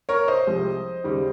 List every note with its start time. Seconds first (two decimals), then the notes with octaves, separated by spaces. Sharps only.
0.09 A#4 C#5
0.28 C5 D#5
0.47 C2 C3 F3 G#3
1.04 D#2 C#3 G3